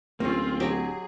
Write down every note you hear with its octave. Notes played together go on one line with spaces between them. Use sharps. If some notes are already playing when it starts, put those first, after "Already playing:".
D1 A#3 C4 C#4 F4
F#3 G4 G#4 D#5